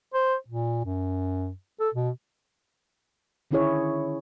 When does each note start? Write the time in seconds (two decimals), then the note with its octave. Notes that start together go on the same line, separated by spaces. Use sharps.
0.14 C5
0.48 A#2
0.85 F#2
1.80 A4
1.94 B2
3.51 D3 D#3 C#4 E4 G#4 C#5